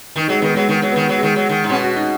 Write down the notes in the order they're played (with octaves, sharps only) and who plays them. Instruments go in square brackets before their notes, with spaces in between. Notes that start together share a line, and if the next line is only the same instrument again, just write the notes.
[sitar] D#3 [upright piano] D#4
[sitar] F#3 [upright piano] G#3
[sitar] D#3 [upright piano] B3
[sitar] F#3 [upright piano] G#3
[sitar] D#3 [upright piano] G#3
[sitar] F#3
[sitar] D#3 [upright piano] B3
[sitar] F#3
[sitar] D#3 [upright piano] G#3
[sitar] F#3
D#3
G#2
[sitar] B2 [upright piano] C#4
[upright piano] F#4
D#4